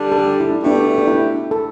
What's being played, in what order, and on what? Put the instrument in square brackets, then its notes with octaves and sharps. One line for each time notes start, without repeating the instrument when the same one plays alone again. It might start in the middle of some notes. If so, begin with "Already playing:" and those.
Already playing: [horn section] D3 G3 D4
[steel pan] A4
G4
E4
D4
[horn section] B2 A3 G4 [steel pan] D4
[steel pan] D4
E4
A4